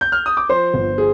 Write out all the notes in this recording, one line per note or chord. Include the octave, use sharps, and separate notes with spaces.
G6
F6
D#6
D6
F3 C5 C6
G1
G#4